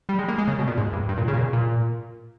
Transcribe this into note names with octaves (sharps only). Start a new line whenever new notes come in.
G3
G#3
A#3
G#3
C#3
B2
A#2
G#2
G2
G2
A#2
C#3
A#2
B2
A#2